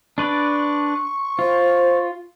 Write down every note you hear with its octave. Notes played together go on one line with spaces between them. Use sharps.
D4 B4 D5 C#6
F4 C5